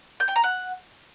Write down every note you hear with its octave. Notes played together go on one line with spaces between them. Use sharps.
G6
G5
A#5
F#5